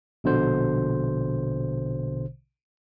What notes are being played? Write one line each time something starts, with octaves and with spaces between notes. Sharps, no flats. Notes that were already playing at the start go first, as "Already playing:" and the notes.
A#1 B2 D3 C5